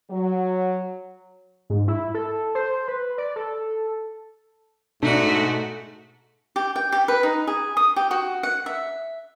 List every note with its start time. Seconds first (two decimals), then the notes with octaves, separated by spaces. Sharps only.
0.11 F#3
1.70 G#2
1.88 E4
2.14 A4
2.55 C5
2.88 B4
3.18 D5
3.36 A4
5.03 G#2 B2 A3 D4 F#4 D5
6.56 G4
6.76 G5
6.92 G4
7.08 B4
7.23 D#4
7.47 G#4
7.77 D#6
7.96 G4
8.11 F#4
8.43 F#5
8.66 E5